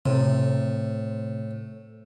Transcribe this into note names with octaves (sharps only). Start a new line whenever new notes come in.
A2 C3